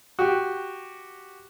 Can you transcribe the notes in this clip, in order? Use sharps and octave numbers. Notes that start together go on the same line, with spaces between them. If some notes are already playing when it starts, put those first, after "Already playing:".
F#4 G4